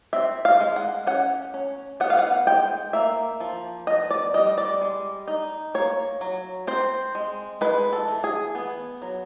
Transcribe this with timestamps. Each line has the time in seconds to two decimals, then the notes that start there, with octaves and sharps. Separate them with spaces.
0.13 C4 E5
0.45 F5
0.60 G#3
0.76 F#5
1.07 C#4 F#5
1.54 C#4
2.00 B3 F#5
2.10 F5
2.19 F#5
2.47 G#3 G5
2.93 A#3 E5
3.40 F3
3.87 B3 D#5
4.10 D5
4.34 G3 D#5
4.58 D5
4.81 G#3
5.28 D#4
5.74 A#3 C#5
6.21 F#3
6.67 C4 C5
7.15 G#3
7.61 G#3 B4
7.93 A4
8.08 E3
8.24 G#4
8.55 B3
9.02 F#3